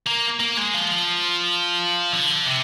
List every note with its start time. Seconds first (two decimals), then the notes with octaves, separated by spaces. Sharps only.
0.06 A#3
0.40 A#3
0.57 G#3
0.74 F3
2.13 D3
2.46 C3